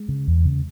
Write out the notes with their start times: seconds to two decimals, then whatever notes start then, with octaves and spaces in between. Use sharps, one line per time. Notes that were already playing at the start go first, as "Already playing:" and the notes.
Already playing: G#3
0.09 C#3
0.27 E2
0.46 C#3